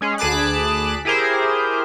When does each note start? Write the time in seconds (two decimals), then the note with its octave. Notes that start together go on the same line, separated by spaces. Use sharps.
0.01 G#3 C#4 G#4
0.18 D2 G#4 A5 B5 D6 F#6
1.05 E4 G4 G#4 A#4 C5